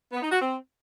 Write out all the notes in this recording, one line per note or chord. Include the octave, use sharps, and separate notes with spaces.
B3
D#4
F#4
C4